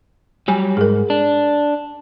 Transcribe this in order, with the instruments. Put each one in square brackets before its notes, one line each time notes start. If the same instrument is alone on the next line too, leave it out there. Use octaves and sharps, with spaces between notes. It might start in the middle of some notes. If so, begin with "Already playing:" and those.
[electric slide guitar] F#3 G3 [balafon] G#5
[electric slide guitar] G#2 [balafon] G#4 A#4
[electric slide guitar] D4